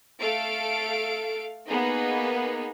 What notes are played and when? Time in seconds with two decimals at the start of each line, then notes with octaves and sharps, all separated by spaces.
0.19 A3 A4 F5 D7
1.69 A#3 B3 D#4 G#4